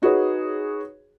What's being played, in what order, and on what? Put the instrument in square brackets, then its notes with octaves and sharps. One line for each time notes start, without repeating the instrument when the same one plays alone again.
[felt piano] D#4 F#4 G#4 B4 C#5